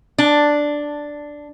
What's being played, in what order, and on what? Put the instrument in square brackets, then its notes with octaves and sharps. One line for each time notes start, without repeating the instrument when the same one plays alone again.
[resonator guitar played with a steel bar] D4